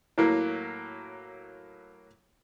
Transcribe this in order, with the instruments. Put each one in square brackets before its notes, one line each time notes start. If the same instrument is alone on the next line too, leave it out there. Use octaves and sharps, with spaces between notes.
[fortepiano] A2 F#3 A#3 [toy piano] E4